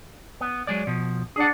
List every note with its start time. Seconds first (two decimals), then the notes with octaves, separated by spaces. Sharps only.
0.41 B3
0.67 F#3 G#3 D5
0.87 B2 F3
1.36 D4 G#4 F#5